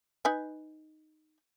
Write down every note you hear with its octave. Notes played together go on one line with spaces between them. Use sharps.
D#4 B4 G#5